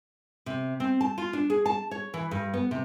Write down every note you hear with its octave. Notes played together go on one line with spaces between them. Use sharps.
C3
C4
A5
F4
D4
G#4
A5
C#5
E3
G2
B3
C3